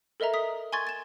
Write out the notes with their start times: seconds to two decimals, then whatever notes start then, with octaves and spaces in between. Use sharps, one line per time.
0.20 A4 A#4 D#5 E5 A#5
0.34 D#6 B6
0.72 G#5 C6 C#6 G#6 A6
0.87 A6 E7